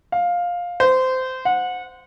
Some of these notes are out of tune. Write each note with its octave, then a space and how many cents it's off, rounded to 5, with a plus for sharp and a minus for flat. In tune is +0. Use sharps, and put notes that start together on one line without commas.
F5 +10
C5 -20
F#5 -25